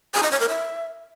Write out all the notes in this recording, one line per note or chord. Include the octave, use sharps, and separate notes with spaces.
G#5
D#5
C#5
A#4
E5